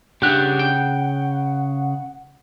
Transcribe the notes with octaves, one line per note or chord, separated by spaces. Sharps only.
C#3 D4 G4 F#5 F#6
G5